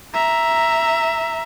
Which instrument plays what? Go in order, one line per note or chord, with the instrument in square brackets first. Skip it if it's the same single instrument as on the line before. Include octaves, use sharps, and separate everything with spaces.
[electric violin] E5 A#5